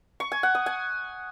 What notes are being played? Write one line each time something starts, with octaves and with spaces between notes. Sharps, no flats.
C#6
G#5
F#5
D#6
G#5